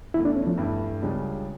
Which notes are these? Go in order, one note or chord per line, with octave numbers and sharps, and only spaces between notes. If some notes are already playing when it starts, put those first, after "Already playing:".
E2 E3 A3 E4
D4
C#4
F3
G2 E3 A3 E4
C#2 C#3 G3 D4